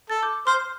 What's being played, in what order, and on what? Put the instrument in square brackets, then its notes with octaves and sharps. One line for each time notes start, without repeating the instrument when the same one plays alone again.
[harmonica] A4 [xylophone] A6
[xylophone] D6 G6
[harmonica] C5 [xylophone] C6 F6